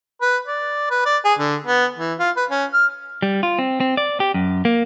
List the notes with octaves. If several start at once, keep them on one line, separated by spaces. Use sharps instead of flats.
B4
D5
B4
D5
G#4
D3
B3
E3
F4
B4
C#4
F6
G3
F4
C4
C4
D5
G4
F#2
A#3